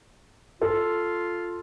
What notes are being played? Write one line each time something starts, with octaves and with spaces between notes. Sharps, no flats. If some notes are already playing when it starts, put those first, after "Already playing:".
F4 A4